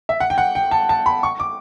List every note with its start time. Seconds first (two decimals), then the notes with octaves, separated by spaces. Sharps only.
0.09 E5
0.20 F#5
0.30 G5
0.38 F#5
0.55 G5
0.71 A5
0.89 A5
1.06 B5
1.23 C#6
1.40 D6